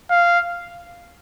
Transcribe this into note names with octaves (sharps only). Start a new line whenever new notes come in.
F5